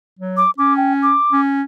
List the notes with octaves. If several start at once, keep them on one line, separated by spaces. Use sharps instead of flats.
F#3
D6
C#4 D6
G5
D6
C#4